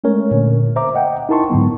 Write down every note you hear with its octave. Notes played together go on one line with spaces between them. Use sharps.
G#3 A3 C#4 A#4 C#5
A#2 D3
C5 E5 A#5 D6
D#5 F#5 G5
D#4 E4 A#4 A5 C6 C#6
G#2 D3 F#3 B3